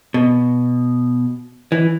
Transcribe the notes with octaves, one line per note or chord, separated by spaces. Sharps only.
B2
E3